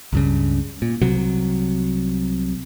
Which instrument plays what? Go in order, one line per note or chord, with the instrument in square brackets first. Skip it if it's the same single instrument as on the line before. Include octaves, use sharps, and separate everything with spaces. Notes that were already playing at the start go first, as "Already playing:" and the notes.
[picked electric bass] C#2 G2 C#3
A#2
C2 C3 F#3